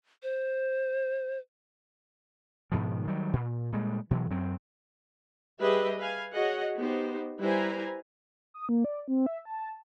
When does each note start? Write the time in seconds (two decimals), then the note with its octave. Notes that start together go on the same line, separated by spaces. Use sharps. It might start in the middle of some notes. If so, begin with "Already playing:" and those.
0.23 C5
2.72 G#2 B2 D#3 F3
3.07 D#3 F#3 G3
3.33 A#2
3.72 A#2 G3 G#3
4.11 B2 E3 F#3
4.30 F#2 F#3 C4
5.60 G3 G4 G#4 B4 D#5 E5
5.99 B4 F5 G#5
6.33 F#4 G#4 C#5 D#5 F#5
6.76 B3 D#4 G4 C5
7.40 G3 E4 B4 C5 G#5 A#5
8.54 D#6
8.69 A#3
8.85 D5
9.08 C4
9.26 E5
9.45 A5